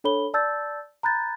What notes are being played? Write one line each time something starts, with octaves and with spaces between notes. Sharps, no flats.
D4 A4 C#5 B5 G7
D5 A5 E6 G6 A6
A#5 B5 F#6 G6 A6